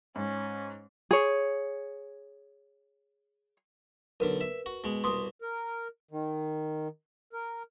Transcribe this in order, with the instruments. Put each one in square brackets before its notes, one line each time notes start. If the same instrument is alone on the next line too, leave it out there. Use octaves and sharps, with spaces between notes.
[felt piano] G#2 [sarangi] C#4
[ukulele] G#4 C#5
[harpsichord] B1 D3 [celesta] A#4 B4
[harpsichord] E5
F#4
B2 G#3
[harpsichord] C2 B2 [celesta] C6 D#6
[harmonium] A#4
D#3
A#4